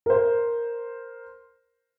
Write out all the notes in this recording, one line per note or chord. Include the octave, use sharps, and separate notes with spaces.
A#4 C5